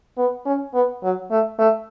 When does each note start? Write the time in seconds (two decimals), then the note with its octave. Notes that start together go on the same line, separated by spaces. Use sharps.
0.18 B3
0.46 C#4
0.74 B3
1.03 F#3
1.31 A3
1.59 A3